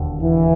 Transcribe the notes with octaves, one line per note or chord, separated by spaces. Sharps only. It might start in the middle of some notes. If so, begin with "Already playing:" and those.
Already playing: E1 D#2 D3
E3